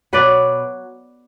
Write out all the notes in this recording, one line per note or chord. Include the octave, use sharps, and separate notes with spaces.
B2 F#3 B4 D5